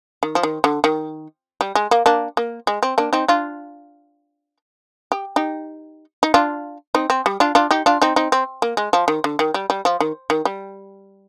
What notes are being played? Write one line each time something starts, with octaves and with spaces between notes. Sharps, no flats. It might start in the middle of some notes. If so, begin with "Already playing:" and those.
D#3
F3
D#3
D3
D#3
G3
G#3
A#3
A#3 D4
A#3
G#3
C4
A#3 D4
C4 D#4
D4 F4
G4
D#4 G4
D#4
D4 F4
C4 D#4
C4
G3
D4 F4
D4 F4
D#4 G4
D4 F4
C4 D#4
C4 D#4
C4
A#3
G#3
F3
D#3
D3
D#3
G3
G3
F3
D#3
D#3
G3